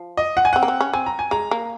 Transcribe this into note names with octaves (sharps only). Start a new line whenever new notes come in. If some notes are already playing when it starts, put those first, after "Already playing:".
Already playing: F3
D#5
F#5
G#5
C4 F#5
A#3
C4
C#4
C4 G#5
A#5
G#5
G#3 A#5
A#3